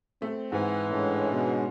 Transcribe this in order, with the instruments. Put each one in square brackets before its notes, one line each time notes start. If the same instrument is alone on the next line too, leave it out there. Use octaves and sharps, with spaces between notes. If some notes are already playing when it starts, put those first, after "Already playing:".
[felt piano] A3 [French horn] C4
[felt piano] G#2 [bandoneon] E3 [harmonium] F#5 G#5
[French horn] A2 [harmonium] G#3 C#4 D4
[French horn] B2